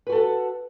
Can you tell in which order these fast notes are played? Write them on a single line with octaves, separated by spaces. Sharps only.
B4 F#4 A4 F#5